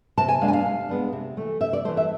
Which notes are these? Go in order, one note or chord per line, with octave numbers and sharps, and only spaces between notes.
C3 A5
G#5
G#3 B3 D4 F5
G#5
F5
C3
G#3 B3 D4
C3
E3 A3
C3 E5
D5
E3 A3 C5
E5